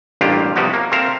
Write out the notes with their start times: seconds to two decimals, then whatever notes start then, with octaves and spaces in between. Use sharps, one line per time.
0.21 A1 G2 A#3 D4 F4 G4
0.56 C3 F3 G3 B3 F#4 G4
0.73 A#3
0.92 C4 A4 A#4 E5 F5 A5